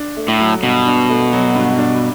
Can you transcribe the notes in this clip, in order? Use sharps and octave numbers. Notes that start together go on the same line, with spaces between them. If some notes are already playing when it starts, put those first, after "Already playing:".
Already playing: D4
A3
A2
F#3
G2 B2
D4
A3
F#3
G2
D4